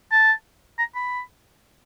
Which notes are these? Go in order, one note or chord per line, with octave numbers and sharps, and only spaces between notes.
A5
A#5
B5